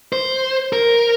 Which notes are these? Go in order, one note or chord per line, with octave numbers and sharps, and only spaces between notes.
C5
A#4